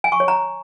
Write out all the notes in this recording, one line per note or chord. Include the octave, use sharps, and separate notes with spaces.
G#5
C#6
C#5
A#5